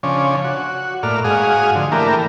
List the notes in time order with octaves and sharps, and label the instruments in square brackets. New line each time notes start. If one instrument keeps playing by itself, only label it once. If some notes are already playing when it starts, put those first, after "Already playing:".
[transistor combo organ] C#3 F3 C#4 D4
F#4
A2 A#3 D5 F6
G#2 F#4 G#4 F5 D#6
D3 F3
E3 A3 A#3 D4 G4 A#4